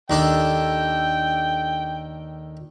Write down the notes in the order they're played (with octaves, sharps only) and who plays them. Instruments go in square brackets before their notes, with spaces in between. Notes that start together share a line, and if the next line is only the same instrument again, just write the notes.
[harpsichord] D#2 D4 A4 [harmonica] G5